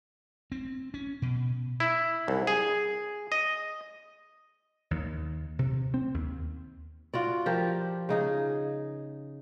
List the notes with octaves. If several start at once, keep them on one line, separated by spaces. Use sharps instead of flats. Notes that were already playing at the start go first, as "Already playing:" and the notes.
C4
C#4
B2
E4
C2
G#4
D#5
D#2
C3
C4
D#2
F4 F#4 D5
F3 G4 A#4
C#3 D#4 G#4